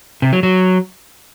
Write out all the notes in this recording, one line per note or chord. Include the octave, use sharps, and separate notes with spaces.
C3
F#3
F#3